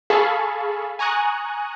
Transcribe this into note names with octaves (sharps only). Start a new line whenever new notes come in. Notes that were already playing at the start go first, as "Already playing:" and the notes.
G#4 A4 F5 A5 B5 C#6
G#5 A#5 C#6 D#6 F#6